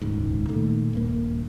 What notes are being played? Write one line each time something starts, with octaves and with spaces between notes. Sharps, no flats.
D#1 C#2 G#2
A#2 D#3 A3
D#1 G2 A#3